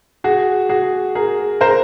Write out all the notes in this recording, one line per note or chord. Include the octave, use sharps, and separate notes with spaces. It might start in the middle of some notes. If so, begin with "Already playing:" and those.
F#4 G#4
F#4 G#4
G#4 A#4
A#4 C5